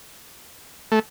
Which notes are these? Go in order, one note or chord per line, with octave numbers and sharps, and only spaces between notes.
A3